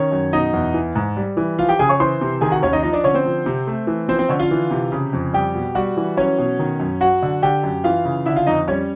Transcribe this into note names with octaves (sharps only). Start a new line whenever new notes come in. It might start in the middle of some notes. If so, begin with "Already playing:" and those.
Already playing: D#3 C#4 C#5
F#2
B2 D#4 D#5
E2
E3
G#2
G3
E3
F3 F4 F5
G4 G5
C#3 G#4 G#5
C#5 C#6
E3 C5 C6
C3
D#3 G#4 G#5
F#4 F#5
D#2 C#4 C#5
D#4 D#5
F3 D#4 D#5
D4 D5
D3 C#4 C#5
C4 C5
F3
C3
A3
E3
F3 C4 C5
C4 C5
D3 C#4 C#5
F4 F5
E3
C3
C#3
F2
G3 G4 G5
B2
G3 F#4 F#5
E3
F#3 C#4 C#5
B2
D#3
F#2
F#3 F#4 F#5
D3
D3 G4 G5
F#2
E3 F4 F5
C#3
D3 E4 E5
F4 F5
F2 D#4 D#5
G3 C#4 C#5